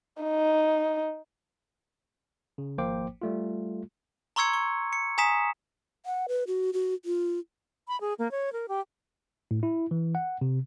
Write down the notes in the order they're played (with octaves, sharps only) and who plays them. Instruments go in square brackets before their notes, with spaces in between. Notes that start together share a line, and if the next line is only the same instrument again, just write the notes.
[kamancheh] D#4
[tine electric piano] C#3
G#1 F3 A#3 C5 G5 D6
G3 A3 F4
[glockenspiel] A#5 C6 C#6 E6 G#6 C#7
C#6
C#7
G#5 A#5 D#6 B6 E7
[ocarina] F#5
B4
F#4
F#4
F4
[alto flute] B5
G#4
A#3
C#5
A#4
G4
[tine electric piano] A2
E4
E3
F#5
C3